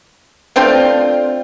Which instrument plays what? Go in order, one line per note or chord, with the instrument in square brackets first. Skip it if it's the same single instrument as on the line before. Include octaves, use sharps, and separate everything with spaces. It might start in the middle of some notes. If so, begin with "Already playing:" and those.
[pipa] A3 C4 D4 F4